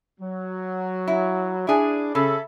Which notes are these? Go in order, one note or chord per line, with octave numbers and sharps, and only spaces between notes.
F#3
E4
D4 E4 G#4
C#3 A4 E5 B5